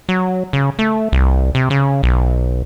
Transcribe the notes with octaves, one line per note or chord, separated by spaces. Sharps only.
F#3
C#3
A3
C2
C3
C#3
B1